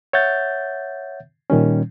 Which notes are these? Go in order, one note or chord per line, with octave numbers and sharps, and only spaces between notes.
C#5 E5 F#5 G6 A6
A#2 D#3 G3 C#4